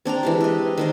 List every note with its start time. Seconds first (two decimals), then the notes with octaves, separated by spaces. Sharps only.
0.05 C4 D4 D5 A#5
0.23 E3 G#3 G4
0.41 D#5 E5
0.78 D#3 D4 C5